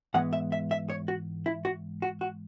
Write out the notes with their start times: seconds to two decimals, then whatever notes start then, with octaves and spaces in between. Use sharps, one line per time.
0.14 G#2 E3 G#3 B3 F#5
0.33 E5
0.52 E5
0.71 E5
0.90 C#5
1.08 F#4
1.46 E4
1.65 F#4
2.02 F#4
2.21 F#4